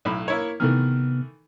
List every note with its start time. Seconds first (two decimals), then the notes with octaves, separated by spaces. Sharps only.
0.05 B1 A2 B5
0.28 A#3 E4 C#5
0.60 C3 D#3 E3 A3 B3 F6